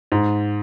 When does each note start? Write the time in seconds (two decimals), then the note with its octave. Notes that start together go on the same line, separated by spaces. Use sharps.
0.12 G#2